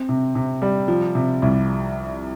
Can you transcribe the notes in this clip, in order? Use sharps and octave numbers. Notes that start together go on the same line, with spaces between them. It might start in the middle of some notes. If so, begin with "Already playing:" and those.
Already playing: C4
C3
C3
G3
F3
C3
C2